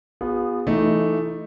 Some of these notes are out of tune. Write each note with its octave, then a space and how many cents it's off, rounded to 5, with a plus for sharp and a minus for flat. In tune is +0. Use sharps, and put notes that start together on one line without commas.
B3 +0 F4 +35 G#4 -30
E3 +20 A3 +0 D#4 +0